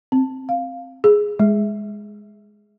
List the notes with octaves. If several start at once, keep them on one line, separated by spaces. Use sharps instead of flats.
C4
F5
G#4
G#3